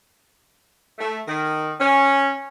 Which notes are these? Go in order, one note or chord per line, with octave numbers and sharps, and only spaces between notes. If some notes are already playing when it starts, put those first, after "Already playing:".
A3
D#3
C#4